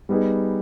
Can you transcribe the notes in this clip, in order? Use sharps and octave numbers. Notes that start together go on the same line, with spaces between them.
G3 B3 D#4 G#4